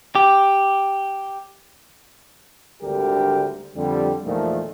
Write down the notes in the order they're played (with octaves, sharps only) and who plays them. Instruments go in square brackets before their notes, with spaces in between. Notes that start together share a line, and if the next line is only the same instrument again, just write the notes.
[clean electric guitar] G4
[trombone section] G#1 D2 D3 G3 G4 A#4
F2 D3 G3
E2 A#2 D#3 F3 A3